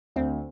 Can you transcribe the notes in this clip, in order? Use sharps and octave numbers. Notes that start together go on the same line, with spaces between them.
D2 C4